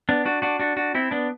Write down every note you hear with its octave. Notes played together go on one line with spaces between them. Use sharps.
B3 D4
D4 F#4
D4 F#4
D4 F#4
D4 F#4
C4 E4
B3 D4